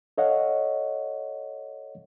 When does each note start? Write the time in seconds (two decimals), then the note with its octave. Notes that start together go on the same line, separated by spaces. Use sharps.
0.18 A4 C#5 D#5 F5 F#5